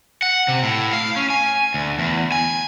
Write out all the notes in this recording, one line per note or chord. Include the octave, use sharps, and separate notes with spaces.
F#5
C3
A2
F5
C#4
G#5
D2
E2
G#5